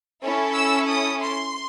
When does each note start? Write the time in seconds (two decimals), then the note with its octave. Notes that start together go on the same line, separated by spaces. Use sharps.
0.23 C#4 E4 A4
0.55 E6
0.89 D#6
1.22 C6